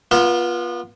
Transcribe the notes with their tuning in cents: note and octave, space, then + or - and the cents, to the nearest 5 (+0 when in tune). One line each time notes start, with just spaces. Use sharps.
B3 -30 F4 +0